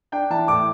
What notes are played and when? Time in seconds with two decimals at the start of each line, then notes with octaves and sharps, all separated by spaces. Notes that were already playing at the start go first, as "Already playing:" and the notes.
0.12 D4 G5
0.30 E3 A5
0.48 A2 D6